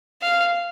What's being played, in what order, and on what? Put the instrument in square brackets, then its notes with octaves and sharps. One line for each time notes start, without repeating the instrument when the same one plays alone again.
[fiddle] F5